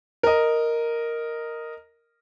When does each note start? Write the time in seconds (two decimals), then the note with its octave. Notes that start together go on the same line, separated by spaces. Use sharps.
0.23 A#4 D#5